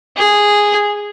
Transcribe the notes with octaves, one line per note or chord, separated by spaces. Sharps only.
G#4